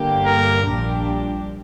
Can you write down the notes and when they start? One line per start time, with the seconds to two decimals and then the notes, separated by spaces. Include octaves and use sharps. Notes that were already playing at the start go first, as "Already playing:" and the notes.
Already playing: G1 G2 D3 A#3 G4
0.26 A#4
0.64 A#1 A#2 G3 D4 G4